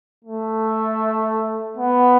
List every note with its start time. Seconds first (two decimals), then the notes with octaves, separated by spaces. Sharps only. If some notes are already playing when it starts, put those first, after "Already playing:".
0.24 A3
1.77 B3